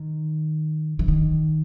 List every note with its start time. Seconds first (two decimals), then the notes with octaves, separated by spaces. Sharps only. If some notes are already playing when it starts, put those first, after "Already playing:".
Already playing: D#3
0.99 E3
1.08 D#3